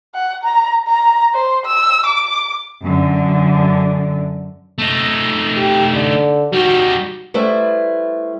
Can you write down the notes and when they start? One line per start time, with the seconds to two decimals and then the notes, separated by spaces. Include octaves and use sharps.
0.14 F#5
0.43 A#5
0.87 A#5
1.34 C5
1.65 E6
2.06 D6
2.84 F#2 D3
4.78 A3 D#4
5.57 G4
5.92 D3
6.53 G3 D#4 F#4
7.34 G3 A3 E4 B4 C5